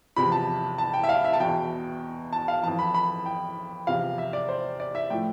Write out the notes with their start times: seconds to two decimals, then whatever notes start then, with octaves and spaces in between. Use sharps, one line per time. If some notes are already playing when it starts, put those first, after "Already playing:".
0.16 E2 C3 F3 B5
0.32 A5
0.78 A5
0.94 G5
1.04 E5
1.09 F5
1.24 E5
1.33 A5
1.40 E2 B2 G5
2.33 A5
2.48 F5
2.63 F2 E3 A5
2.79 B5
2.94 B5
3.26 G5
3.87 E2 C3 F3 F5
4.18 E5
4.33 D5
4.49 C5
4.80 D5
4.95 E5
5.10 A2 F3 G5